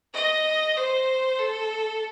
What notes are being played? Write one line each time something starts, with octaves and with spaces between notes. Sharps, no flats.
D#5
C5
A4